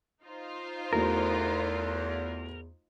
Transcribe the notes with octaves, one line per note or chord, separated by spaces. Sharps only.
D#4 F4 C5
E2 A3 E4 F#4 A#4